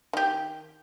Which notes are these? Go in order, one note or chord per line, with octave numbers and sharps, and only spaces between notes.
D#3 G4